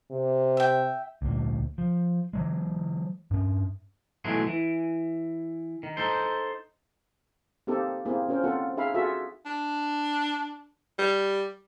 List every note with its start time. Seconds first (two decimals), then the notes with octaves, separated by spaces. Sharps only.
0.11 C3
0.57 E5 G5
1.22 D2 A#2
1.78 F3
2.33 E3 F#3 G#3
3.31 G2 C#4
4.25 B1 E3 F#3 G#3 A3 G#4
4.47 E3
5.83 D#3
5.97 D#4 A4 C5
7.67 A#3 C4 D#4 G4 A4
8.06 A#3 C4 E4 G#4
8.29 C#4 F4 A#4 C5
8.44 A#3 C4 F4 A4 F#5
8.77 D#4 G#4 E5 F5 B5
8.94 F4 F#4 G#4 A4 E5
9.46 D4
10.99 G3